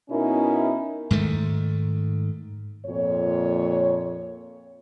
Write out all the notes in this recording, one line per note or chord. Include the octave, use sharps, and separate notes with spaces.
B2 C#4 D#4 E4 A#4
G#2 D#3 A3
F2 A#2 C#5